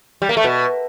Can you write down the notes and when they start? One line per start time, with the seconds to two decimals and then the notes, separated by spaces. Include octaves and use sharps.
0.22 G3
0.29 A#3
0.37 A3
0.44 B2